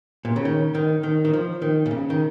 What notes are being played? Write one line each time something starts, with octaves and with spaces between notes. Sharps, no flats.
A#2
C#3
D#3
D#3
D#3
D#3
F3
D#3
A#2
C#3
D#3